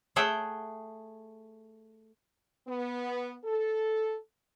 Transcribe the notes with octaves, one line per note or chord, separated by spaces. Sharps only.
A3 G#4 E5 F#5 G5
B3
A4